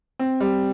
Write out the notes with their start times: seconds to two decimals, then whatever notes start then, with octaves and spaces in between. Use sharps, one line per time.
0.19 C4
0.40 G3